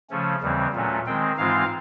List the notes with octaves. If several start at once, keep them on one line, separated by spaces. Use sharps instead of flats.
C#3 F3 A3 C#4
D#2 C#3 E3 G3 C4
A#2 F#3 A3 C#4
D#3 G#3 C4 G5
G#2 E3 G#3 C4 F4 F5